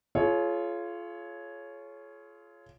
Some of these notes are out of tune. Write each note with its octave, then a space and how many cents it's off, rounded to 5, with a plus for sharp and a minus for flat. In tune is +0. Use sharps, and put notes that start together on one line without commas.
F4 -15 G#4 +45 C#5 +0